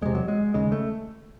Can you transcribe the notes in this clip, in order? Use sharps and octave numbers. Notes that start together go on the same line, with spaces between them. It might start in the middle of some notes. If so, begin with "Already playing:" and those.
E2 C3 G#3
F#3
G#3
D#2 C#3 G#3
A3